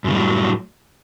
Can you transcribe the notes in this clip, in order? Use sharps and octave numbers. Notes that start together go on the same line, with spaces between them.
F#2 A2 C#3 F#3 G3